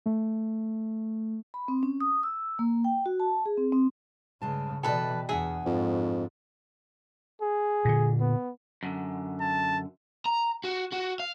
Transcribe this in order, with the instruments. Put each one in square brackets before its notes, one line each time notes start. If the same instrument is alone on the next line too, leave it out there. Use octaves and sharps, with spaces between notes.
[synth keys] A3
[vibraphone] B5
C4
C#4
D#6
E6
A#3
G5
F#4
A5
G#4
C4
C4
[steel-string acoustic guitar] G2 G#3 A5 [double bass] C#3
[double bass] B2 E3 [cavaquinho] A4 B4 A5 [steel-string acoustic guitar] D5 D#5 G5
[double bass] E2 [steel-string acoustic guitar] D4 F#5 [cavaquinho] G#4 E5
[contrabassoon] F2 [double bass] G#2
[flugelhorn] G#4
[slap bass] A#2 D3
[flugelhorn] B3
[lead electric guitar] F#2 D3
[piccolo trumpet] A5
[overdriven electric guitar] A#5
F#4
F#4
F5